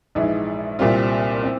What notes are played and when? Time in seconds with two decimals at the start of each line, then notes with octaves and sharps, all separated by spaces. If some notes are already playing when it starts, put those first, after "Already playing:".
0.15 A#1 G#2 E3 G#3
0.79 C2 A#2 G3 C4 F4
1.44 C4